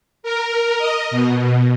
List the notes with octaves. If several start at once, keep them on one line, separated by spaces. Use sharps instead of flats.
A#4
D#5
B2